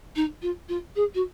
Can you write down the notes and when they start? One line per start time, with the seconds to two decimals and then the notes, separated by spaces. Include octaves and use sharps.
0.16 D#4
0.42 F4
0.69 F4
0.96 G#4
1.14 F#4